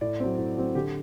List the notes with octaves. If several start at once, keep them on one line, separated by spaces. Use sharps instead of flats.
A2 D5
F#3 C4
A2
F#3 C4
D3 G4